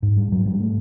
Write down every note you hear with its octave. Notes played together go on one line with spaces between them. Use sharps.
G#2
G3
G#2 F#3
G3
A3